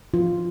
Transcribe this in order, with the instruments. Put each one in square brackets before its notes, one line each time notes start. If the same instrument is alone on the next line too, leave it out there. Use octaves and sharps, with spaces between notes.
[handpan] F3 F4